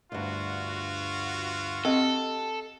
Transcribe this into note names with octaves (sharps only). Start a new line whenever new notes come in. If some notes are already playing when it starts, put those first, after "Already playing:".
D2 G2 F4 F#4
C4 G4 A4 D#5 F#5